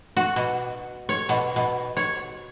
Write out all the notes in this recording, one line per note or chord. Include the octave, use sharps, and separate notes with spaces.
F#4
B2
C#5
B2
B2
C#5